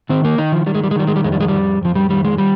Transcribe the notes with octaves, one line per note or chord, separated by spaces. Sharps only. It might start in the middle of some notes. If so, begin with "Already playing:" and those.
D#3 C4
A#3
D#3 D#4
F3
D#3 G3
G#3
G3
G#3
D#3 G3
G#3
G3
F2 G#3
G3
G#3
F2 G3
F2 F3
G3
D#3 G3
G#3
G3